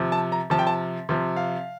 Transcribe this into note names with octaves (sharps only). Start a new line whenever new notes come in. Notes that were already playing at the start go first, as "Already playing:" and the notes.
Already playing: C3 F3
A5
A#5
C3 F3 A5
G5
A5
C3 F3
F5